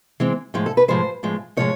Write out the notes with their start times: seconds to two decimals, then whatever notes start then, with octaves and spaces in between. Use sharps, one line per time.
0.20 E3 G#3 C4
0.54 A2 F3 G#3
0.66 A4
0.77 B4
0.88 A2 F3 G#3 C5
1.23 A2 F3 G#3
1.57 A2 F3 G#3 C#5